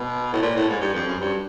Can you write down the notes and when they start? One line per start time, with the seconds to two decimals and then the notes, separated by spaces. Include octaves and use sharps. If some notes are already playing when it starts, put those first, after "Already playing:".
Already playing: B2
0.33 A2
0.42 A#2
0.56 A2
0.69 G#2
0.81 G2
0.95 F2
1.08 F#2
1.21 G2